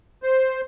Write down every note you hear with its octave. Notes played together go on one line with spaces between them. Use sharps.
C5